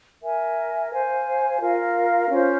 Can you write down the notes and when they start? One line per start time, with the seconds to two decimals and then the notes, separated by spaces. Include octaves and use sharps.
0.22 A#4 E5 G#5
0.90 C5 F5 G#5
1.59 F4 A#4 F5
2.28 C#4 F4 C5